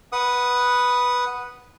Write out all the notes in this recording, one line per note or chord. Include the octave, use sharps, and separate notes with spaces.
B4 F#5 D#6